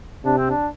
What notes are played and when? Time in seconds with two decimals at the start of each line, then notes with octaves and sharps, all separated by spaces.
0.24 C3 D4
0.38 C4
0.50 D4